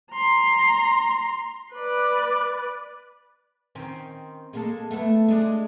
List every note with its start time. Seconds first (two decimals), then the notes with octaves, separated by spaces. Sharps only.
0.12 A#5 C6
1.74 B4 D5
3.75 D#3 C4 C#4
4.53 G#3 A#3 A4
4.91 A3 B3 A4
5.28 G#3 D4